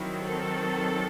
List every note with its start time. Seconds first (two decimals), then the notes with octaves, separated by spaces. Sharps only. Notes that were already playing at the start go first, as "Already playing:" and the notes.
Already playing: D#3 F#3 C4 E4
0.24 A4